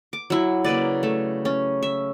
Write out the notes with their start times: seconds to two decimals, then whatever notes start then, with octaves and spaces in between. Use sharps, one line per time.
0.13 D6
0.30 F#3 E4
0.64 C#3 A#3 B4 D5
1.03 A3
1.45 C#4
1.83 E5